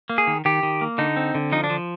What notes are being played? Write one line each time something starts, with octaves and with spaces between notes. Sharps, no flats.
A#3
G#4
D#3
D#3 G4
D#3
A#3
D3 D#4
C4
D3
F3 D#4
D4
F3